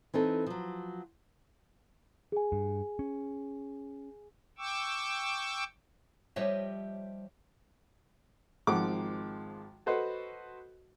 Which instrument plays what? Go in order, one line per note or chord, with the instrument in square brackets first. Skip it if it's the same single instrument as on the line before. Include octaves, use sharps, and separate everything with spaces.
[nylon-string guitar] E3 C4 D#4 A4
F3 F#3
[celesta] G#4 G#5
[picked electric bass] G2
C#4
[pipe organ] G5 C#6 D6 E6
[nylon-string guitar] F3 G3 G4 C#5 D#5 E5
[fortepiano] G#1 D#3 F3 G#3 F#5 D6
F#4 A4 B4 C5 D#5 F#5